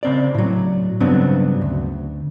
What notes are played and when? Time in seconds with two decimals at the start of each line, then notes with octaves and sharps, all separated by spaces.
0.03 C#3 C4 D5
0.35 A2 F#3
1.00 G2 C#3 F#3 B3 C4 D4
1.61 D2